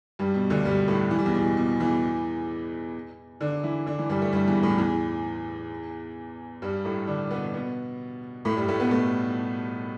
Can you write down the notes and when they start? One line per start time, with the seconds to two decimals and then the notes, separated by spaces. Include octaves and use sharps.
0.19 G2 G3
0.34 B2
0.50 D2 D3
0.65 G2 G3
0.88 A2 A3
1.11 E3
1.19 G3
1.26 E2 E3
1.34 B2
1.57 B2
1.80 E2 E3
3.41 D3 D4
3.63 E3 E4
3.86 D3 D4
3.99 E3
4.10 G2 G3
4.22 A3
4.32 G2 G3
4.47 E2 E3
4.63 A2 A3
4.78 E2 E3
6.62 G2 G3
6.85 A2 A3
7.07 D3 D4
7.31 B2 B3
7.54 B2 B3
8.45 A2 A3
8.57 G2 G3
8.68 A2 A3
8.80 B2 B3
8.91 A2 A3